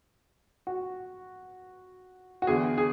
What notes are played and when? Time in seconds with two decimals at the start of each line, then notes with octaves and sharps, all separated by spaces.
0.67 F#4
2.42 F#4
2.47 E2 D3 G#4
2.78 G#4